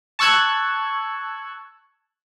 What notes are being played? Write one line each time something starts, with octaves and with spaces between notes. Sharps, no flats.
A5 C#6 E6 F#6 G#6